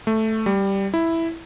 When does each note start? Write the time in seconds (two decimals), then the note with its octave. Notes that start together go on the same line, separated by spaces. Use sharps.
0.07 A3
0.46 G3
0.94 E4